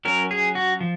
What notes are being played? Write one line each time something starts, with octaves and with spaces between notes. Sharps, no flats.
F#3 C#4 A#4
G#4
F#4
F3